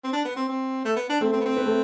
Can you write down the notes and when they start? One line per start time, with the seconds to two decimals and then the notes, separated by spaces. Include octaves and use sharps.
0.04 C4
0.13 D4
0.25 B3
0.36 C4
0.49 C4
0.85 A3
0.96 B3
1.09 D4
1.21 A3 C4
1.33 C4
1.40 B3
1.45 C4
1.57 B3
1.66 A3